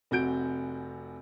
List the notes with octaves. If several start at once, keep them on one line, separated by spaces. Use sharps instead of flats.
F1 C3 F#4 G6 D7